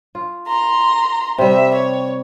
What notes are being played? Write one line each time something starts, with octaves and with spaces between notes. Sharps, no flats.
F4
A#5 C6
C3 G3 E5
C#5